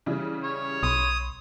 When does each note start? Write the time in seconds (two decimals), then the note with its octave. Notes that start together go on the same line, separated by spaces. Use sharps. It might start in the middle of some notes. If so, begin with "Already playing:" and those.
0.06 C#3 E3 G3
0.44 C#5
0.83 B1 B5 C6 D#6